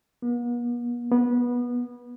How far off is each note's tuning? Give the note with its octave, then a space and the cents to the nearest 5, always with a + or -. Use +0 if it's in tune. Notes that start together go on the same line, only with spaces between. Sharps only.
B3 -45
B3 -20